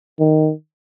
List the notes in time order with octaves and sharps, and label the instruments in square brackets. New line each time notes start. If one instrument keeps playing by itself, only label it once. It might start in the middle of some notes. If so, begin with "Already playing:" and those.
[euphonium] D#3